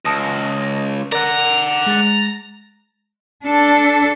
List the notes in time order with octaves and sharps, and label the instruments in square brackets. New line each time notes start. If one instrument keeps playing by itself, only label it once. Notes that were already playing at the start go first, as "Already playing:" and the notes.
[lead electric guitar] C#2 [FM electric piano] A5 D#6 A#6
[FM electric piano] A#4 [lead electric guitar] D5 F#5 [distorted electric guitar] A#5
[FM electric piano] G#3 A6
[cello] D4 A4